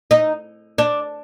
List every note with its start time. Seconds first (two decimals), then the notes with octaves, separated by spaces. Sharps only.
0.11 D#4
0.78 D4